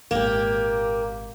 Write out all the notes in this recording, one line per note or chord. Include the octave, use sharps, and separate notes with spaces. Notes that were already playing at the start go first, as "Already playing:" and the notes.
G#1 A#2 A#3 G4